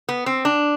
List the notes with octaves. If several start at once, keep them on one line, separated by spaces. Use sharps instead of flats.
B3
C4
D4